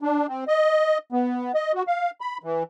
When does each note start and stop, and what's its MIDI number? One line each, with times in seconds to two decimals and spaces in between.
0.01 0.27 62
0.29 0.44 60
0.48 0.98 75
1.12 1.52 59
1.54 1.72 75
1.74 1.83 66
1.87 2.10 77
2.21 2.38 83
2.43 2.63 52